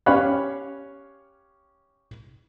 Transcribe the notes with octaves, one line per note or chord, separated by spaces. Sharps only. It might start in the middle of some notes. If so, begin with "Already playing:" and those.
C#4 G4 C#5 F5 B5 F#6